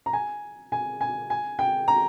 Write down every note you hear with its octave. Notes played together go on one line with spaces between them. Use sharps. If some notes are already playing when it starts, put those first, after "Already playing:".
A#5
G#5
G#5
G#5
G#5
G5
A#5